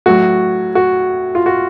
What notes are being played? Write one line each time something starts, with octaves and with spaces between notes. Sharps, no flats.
A2 F#3 F#4
F#4
F4
F#4